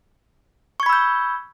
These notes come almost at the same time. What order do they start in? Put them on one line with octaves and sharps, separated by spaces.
C#6 G#6 B5 E6 G6